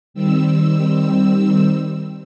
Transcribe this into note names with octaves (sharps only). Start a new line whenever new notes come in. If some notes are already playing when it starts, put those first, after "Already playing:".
D#3 G3 C4 E6